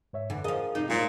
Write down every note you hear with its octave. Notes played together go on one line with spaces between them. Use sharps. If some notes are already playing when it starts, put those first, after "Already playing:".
G#2 C#5 E5
F#2 D3 E3
F3 G#4 A#4 D#5 F5
F2 C3 D#4
A#2 F#3 G#3 D#4 C5